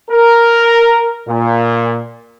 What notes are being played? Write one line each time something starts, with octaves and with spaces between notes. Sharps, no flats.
A#4
A#2